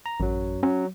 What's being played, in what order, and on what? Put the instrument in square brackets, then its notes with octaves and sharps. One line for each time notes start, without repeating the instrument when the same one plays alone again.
[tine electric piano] A#5
[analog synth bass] A1 [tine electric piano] F#2 F#3
[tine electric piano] F#3 [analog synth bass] C#4